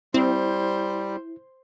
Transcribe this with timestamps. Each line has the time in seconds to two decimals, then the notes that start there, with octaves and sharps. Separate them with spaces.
0.14 G3 C4 E4 C5